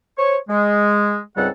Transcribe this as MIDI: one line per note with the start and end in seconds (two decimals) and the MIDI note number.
0.18 0.37 72
0.18 0.37 73
0.18 0.37 85
0.49 1.19 56
1.37 1.49 37
1.37 1.49 44
1.37 1.49 55
1.37 1.49 60
1.37 1.49 69
1.37 1.49 78